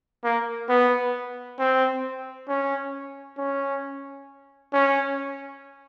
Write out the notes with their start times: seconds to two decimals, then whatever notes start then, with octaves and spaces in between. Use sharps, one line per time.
0.24 A#3
0.69 B3
1.59 C4
2.48 C#4
3.38 C#4
4.73 C#4